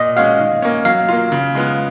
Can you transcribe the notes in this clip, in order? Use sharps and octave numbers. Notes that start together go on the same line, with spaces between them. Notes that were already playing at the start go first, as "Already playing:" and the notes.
Already playing: A#2 D#5
G#3 C#4 F#4 F5
D#3
A#3 C#4
F#3 F5
A#3 F4
C#3
G#3 B3 F4